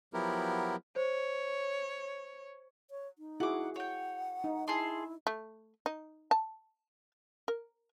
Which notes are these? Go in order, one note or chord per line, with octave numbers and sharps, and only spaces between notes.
F3 F#3 B3 E4 G4 A#4
C5 C#5
C#5
D#4
E4 F#4 G#4 F#5 D6
C#5 F#5 G5
D#4
E4 G#4 A5 C6
A3
D#4
A5
A#4